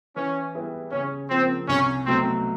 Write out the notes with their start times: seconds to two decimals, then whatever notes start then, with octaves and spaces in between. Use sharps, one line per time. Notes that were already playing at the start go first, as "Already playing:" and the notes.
0.16 E3 C#4
0.55 G3 B3 E4 G#4
0.92 C#3 C#4
1.30 F3 A#3 C4
1.69 C2 C#4
2.06 B2 F#3 A3 C4